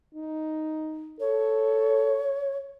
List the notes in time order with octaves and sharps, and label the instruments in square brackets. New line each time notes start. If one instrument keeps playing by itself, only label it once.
[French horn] D#4
[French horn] A4 [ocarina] C#5